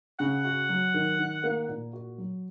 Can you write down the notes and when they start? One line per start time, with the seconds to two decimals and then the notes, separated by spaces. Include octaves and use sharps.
0.19 C#3 F#5
0.45 F#4
0.69 F#3
0.94 D#3
1.19 D#3
1.44 A#3
1.69 A#2
1.93 F#4
2.18 F#3